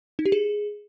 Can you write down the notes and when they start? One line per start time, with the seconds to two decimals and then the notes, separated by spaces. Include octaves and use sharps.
0.19 D#4
0.26 G4
0.32 G#4